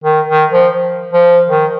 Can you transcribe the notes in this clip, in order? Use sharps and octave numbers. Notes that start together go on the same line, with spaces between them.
D#3
D#3
F3
F3
D#3